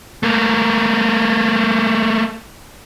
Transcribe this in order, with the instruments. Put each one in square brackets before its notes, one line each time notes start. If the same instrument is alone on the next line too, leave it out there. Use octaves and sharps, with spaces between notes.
[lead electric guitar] A3 A#3